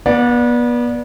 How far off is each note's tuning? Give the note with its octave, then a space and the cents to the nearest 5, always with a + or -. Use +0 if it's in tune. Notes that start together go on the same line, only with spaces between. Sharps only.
B3 -30 D5 +0 F#5 -40